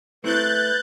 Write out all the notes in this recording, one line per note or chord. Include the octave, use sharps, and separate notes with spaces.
A3 C4 E4 B4 F#6 G6 A6